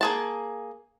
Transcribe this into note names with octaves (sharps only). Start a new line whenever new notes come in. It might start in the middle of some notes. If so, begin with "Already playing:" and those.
A#3 G#4 A5